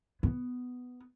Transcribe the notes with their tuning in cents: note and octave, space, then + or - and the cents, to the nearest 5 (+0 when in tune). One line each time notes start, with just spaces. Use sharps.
B3 +5